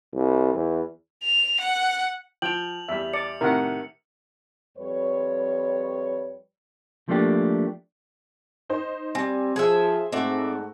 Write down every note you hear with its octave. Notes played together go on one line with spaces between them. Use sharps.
C2
E2
F7
F#5
F3 G5 F7 F#7
E2 G3 E5
D5 C#7
A2 C3 D#3 A#4 F#5
F2 G3 B4 C#5
F3 A3 A#3 D4 G4
D#4 C5
G3 C4 G#5
F3 G#4 C5 E5
G#2 A3 C4 F#4 D5 E5